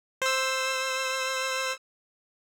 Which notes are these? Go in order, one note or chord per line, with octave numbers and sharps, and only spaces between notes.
C5 E6